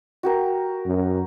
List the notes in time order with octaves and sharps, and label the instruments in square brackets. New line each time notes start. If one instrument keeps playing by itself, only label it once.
[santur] F#4 G4 A#4
[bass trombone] F#2